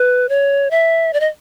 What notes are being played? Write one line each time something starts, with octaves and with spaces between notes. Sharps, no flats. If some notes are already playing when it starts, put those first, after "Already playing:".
Already playing: B4
C#5
E5
D5
D#5